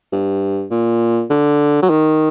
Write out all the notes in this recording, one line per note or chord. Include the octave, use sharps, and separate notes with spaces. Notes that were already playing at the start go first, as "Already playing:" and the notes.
G2
A#2
D3
F#3
D#3